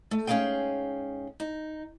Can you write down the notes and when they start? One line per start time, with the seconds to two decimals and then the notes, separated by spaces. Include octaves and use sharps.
0.11 A3
0.27 G#2 C#4 G#4 A#4 F5 G5
1.40 D#4